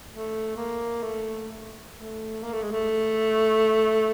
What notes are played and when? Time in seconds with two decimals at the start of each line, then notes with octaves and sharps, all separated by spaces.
0.10 A3
0.56 A#3
1.03 A3
1.96 A3
2.43 A#3
2.53 A3
2.63 G#3
2.72 A3